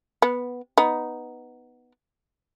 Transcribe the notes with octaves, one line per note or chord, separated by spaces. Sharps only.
B3
B3 D#4